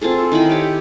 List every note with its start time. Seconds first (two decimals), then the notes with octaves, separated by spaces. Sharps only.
0.01 C4 F4 G#4 A4
0.32 D#3 E4 D#5 B5
0.49 G4 C#5 G5